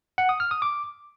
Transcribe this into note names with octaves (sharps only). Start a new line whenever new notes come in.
F#5
D#6
F6
D#6
D6